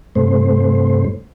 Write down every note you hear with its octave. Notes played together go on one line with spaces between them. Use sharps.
G2 C3 A3 C5